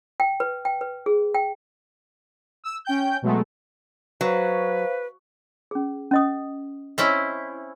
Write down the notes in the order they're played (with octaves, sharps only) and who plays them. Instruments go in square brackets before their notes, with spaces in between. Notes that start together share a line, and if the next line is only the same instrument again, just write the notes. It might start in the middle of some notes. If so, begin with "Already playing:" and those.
[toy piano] G5
B4
G5
B4
G#4
G5
[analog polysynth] E6
C#4 G5 G6
B2 F#3 G#3 A3
[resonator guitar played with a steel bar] F#3 [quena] B4 [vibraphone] C5 F5
[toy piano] C#4 G#4
C#4 D#5 D#6
[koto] C4 C#4 E4 [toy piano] D#5 C#6